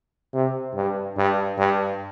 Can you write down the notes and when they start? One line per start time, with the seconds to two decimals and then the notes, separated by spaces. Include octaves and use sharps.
0.33 C3
0.75 G2
1.17 G2
1.58 G2